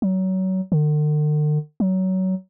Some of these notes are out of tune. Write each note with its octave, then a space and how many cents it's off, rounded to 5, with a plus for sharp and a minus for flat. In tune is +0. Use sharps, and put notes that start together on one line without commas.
F#3 +25
D3 +45
F#3 +20